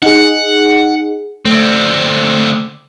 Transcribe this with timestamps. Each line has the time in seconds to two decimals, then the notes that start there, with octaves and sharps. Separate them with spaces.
0.02 D#4 G#4 F#5
1.45 D3 A3 C4